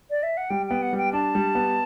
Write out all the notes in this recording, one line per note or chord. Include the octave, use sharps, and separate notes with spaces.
D5
E5
F#5
G3 G5
B3 G5
F#5
G3
G5
D4 A5
G3
B3